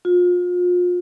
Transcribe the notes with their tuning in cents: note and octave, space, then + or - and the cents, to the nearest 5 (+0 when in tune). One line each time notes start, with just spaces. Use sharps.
F4 +35